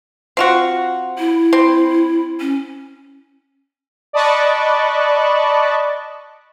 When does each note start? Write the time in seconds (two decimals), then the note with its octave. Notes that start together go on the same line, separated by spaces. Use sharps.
0.37 C4 F4 F#4
1.18 E4
1.53 C4
2.41 C#4
4.13 D5 D#5 A5 B5 C#6 F#6